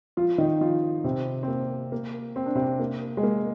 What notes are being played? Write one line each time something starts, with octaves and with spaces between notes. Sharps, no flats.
F3 F4
D#3 D#4
F3 F4
C3 C4
C4
A#3
A#3
C4
D4
C3 C4
A#3
G#3
A#3